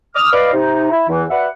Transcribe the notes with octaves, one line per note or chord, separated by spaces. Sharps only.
D6 D#6 F6
B4 D5 D#5 F5
C3 D#4
E4
E2 E3
F#4 B4 D5 E5 F#5